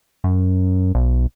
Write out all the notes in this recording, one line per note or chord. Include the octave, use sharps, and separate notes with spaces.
F#2
B1